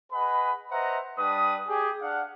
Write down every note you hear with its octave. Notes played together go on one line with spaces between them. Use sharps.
G#4 B4 D#5 F#5 B5
B4 C5 D#5 E5 F#5 A#5
G3 D4 B4 D#6
G4 G#4
D4 F5 F#5